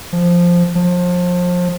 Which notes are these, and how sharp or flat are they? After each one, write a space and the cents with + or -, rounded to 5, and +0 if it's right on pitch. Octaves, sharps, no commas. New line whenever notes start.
F3 +0
F3 +30